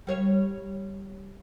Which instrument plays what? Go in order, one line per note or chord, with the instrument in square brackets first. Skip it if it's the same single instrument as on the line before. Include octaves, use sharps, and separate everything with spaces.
[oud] G3 C#5 F5